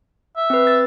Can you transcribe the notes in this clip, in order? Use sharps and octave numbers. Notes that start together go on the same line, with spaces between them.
E5
C4 B4
E6 A6